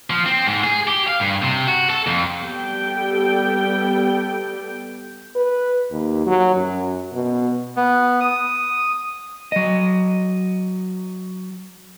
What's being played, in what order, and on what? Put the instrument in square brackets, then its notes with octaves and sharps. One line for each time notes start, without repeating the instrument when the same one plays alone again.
[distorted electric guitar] F3
C4
G#2
G#4
G4
F5
G2
C3
F#4
A4
F2
[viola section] G3 B3 G4 A4 G5
[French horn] B4
D#2
F#3
F#2
B2
[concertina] B3
D#6
[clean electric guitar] F#3 D#5